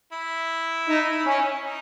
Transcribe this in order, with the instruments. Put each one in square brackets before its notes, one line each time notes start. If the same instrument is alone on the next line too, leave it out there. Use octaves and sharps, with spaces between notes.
[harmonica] E4
[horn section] D#4
C#4
[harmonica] D#4